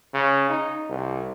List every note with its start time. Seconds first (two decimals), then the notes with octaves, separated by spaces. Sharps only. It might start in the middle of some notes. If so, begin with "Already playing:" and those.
0.14 C#3
0.50 D#4
0.89 C2